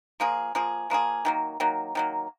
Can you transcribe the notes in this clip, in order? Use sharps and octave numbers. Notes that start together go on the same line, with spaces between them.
F3 A#3 F4 G#4
F3 A#3 F4 G#4
F3 A#3 F4 G#4
D#3 F#3 A#3
D#3 F#3 A#3
D#3 F#3 A#3